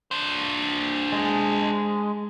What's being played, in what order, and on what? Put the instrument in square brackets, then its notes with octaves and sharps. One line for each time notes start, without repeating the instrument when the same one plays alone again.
[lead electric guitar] D4 C5
[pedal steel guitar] G#3